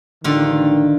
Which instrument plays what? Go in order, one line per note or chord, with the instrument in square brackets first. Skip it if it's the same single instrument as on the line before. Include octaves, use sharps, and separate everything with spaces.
[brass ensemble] A1 D#3 [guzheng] D3 F4